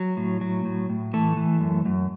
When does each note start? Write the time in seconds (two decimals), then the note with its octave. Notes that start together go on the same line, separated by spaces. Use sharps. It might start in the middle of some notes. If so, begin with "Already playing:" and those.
Already playing: F#3
0.17 A2
0.41 F#3
0.65 A2
0.90 A2
1.13 E3 A3 A4
1.37 E3
1.61 F#2
1.85 F#2